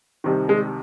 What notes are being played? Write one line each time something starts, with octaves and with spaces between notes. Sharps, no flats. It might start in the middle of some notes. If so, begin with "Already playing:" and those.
C2 C3 D#3
G#3